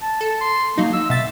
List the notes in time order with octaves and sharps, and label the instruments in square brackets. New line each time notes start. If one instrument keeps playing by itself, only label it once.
[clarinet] A5
[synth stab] A4
[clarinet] C6
[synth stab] F#3 D#4 [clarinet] A#3
[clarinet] E6
[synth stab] B2 A6 [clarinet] E5